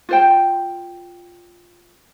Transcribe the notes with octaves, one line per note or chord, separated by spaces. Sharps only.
F4 C5 G5